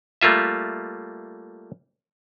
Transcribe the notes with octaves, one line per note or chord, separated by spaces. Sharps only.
G3 A3 A#3 F4 E5